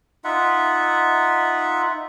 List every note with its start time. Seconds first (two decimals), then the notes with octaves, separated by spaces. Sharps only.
0.24 D#4 F4 E5 F#5